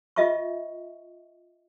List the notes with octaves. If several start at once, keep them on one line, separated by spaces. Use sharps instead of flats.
F4 D#5 E5 A5 C#6